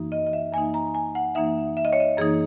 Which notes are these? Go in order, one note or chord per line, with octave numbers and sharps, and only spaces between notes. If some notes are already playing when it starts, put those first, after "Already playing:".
Already playing: F#2 E3 A#3 D#4
D#5
D#5
E5
F#2 E3 A#3 D#4 G#5
A#5
G#5
F#5
F#2 E3 A#3 D#4 E5
E5
D#5
C#5
D#5
F#2 E3 A#3 D#4 G#4